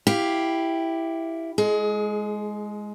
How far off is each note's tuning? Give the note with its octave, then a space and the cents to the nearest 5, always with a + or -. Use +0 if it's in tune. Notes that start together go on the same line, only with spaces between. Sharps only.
E4 +0 G4 +0 F5 +0
G#3 +0 G#4 +30